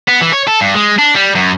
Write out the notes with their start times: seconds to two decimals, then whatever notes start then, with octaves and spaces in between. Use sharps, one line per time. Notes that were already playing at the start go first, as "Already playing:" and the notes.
0.08 B3
0.21 E3
0.33 C#5
0.48 A4
0.61 G2
0.75 G#3
0.98 D4
1.15 G3
1.35 F#2